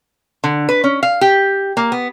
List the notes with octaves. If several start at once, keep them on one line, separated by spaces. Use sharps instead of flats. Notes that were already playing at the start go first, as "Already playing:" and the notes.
D3
B4
C#4
F5
G4
A#3
B3